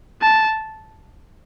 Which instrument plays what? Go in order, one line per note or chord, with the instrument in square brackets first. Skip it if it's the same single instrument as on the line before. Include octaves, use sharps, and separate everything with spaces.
[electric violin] A5